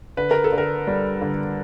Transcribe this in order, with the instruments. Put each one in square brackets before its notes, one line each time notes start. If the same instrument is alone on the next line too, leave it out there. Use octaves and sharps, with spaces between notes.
[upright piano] D3 [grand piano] B4
[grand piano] A#4
A4
[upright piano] D3
[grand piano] A#4
[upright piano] G3
D3